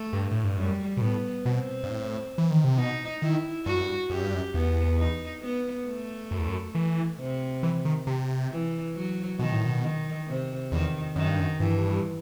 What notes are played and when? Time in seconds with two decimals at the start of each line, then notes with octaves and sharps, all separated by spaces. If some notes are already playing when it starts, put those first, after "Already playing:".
Already playing: A3
0.13 G2
0.31 A2
0.44 G2
0.57 F#2 G3
0.97 B2
1.01 A2 B3
1.46 B2 C4
1.84 G2
1.90 A2
2.38 E3
2.51 D#3
2.64 C3
2.78 B2 D#4
3.22 D#3 E4
3.66 G2 F#4
3.74 F#2
3.82 G2
4.10 F#2 G4
4.22 G2
4.34 F#2
4.54 E2 B3
4.98 D#4
5.42 B3
5.87 A3
6.31 F#2
6.39 E2
6.48 F#2
6.75 E3
7.19 C3
7.63 E3
7.85 D#3
8.07 C3
8.51 E3
8.95 F#3
9.39 B2 D#3
9.52 A2
9.65 B2
9.83 D#3
10.27 C3
10.72 E2 D#3
11.16 F#2 D#3
11.28 G2
11.40 F#2
11.60 G2 E3